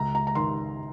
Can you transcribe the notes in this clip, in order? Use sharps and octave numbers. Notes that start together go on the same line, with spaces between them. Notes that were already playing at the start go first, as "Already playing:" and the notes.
Already playing: C#2 A#5
A#5
A#5
D#3 C6